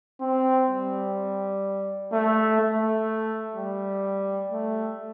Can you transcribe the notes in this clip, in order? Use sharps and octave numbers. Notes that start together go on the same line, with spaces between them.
C4
G3
A3
A3
G3
A3